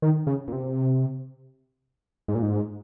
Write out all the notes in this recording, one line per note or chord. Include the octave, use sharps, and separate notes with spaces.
D#3
C#3
A#2
C3
G#2
A#2
G#2